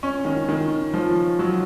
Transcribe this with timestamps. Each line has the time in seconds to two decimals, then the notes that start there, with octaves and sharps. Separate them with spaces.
0.03 C#4
0.25 D#3
0.49 D#3
0.94 F3
1.39 F#3